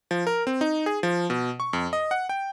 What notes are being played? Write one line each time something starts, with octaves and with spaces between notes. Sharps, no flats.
F3
A#4
C4
D#4
G#4
F3
B2
C#6
F2
D#5
F#5
G5